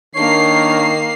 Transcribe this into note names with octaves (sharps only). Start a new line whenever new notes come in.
D#3 A#3 D4 C#5 C7